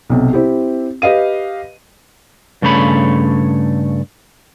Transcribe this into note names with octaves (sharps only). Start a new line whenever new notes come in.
B1 C3
C4 E4 G4
G4 B4 D#5 F5 D#7
G2 C#3 A3 C#5 B5